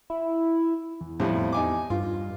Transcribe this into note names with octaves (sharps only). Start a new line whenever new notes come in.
E4
E2
F2 A2 G3
D#4 G#5 D6
G2 F4